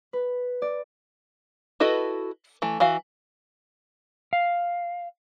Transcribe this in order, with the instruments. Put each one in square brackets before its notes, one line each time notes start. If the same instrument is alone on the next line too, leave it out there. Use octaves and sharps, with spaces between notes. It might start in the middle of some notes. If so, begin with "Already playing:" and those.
[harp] B4
D5
[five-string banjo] E4 F#4 A4 B4 D#5
E3 A3
E3 F#4 F5
[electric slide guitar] F5